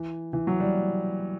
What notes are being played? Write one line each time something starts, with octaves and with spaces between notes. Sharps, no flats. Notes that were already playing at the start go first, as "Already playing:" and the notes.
Already playing: E3
E3
F#3
G3